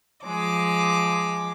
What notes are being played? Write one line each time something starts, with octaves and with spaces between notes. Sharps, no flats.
F3 G#3 D6